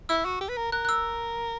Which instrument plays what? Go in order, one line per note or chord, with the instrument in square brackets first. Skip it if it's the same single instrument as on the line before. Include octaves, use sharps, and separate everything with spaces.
[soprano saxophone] E4 [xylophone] E6
[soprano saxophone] F#4
G4
B4
A#4
[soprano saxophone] A#4 [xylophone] F#6
[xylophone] F#6
E6